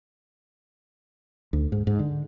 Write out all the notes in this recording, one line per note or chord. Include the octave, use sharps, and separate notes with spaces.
D2
G#2
G#2
D3